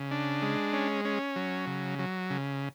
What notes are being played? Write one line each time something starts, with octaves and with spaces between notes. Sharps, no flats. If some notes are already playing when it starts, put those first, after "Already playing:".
Already playing: C#3
D4
G#3
C#4
C#4
F#3
C#3
F#3
C#3